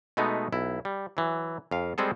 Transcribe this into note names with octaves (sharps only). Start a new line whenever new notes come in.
B2 G#3 A3 B3 D#4
B1 E4
G3
E3 F#3
F2 F5
G3 G#3 C4 G#4 A4